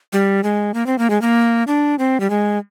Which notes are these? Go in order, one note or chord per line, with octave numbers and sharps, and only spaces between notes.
G3
G#3
A#3
C4
A#3
G#3
A#3
D4
C4
G3
G#3